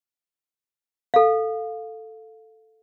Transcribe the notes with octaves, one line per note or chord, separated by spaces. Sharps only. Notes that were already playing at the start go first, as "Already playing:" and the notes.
A4 F5